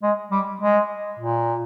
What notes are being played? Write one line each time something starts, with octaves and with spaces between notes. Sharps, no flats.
G#3
G3
G#3
A#2